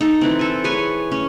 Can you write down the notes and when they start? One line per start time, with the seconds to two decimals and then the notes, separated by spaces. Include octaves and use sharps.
0.01 D#4 A4
0.21 E3 C4
0.39 A4 G#5
0.64 G#4 B4 C#5 G#5
1.11 C#4